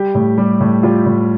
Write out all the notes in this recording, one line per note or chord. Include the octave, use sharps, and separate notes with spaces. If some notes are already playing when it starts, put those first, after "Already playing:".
Already playing: G3 G4
A2
G3
A2
G3 F4
A2